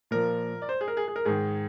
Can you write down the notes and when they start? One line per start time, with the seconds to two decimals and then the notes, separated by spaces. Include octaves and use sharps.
0.11 A#2 F3 A#4
0.62 D5
0.69 C5
0.81 G#4
0.88 A#4
0.97 G#4
1.08 G#4
1.16 A#4
1.25 G#2 D#3 G#4